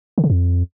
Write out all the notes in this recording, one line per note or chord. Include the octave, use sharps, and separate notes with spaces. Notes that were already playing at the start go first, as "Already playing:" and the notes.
D3
C#3
F2